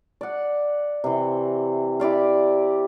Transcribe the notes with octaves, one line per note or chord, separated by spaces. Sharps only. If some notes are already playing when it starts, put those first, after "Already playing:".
D5 F#5
C3 E3
E4 G4 D5 F5